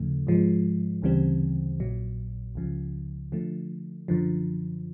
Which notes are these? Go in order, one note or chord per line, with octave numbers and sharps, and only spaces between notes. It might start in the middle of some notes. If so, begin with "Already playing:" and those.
Already playing: D#2 C#3 F3 A3
G#2 F3 G#3
D2 C#3 E3 G3 C4
A#1 A#2 F#3
C#2 C#3 F3
D3 F3 A3
F#2 D3 F3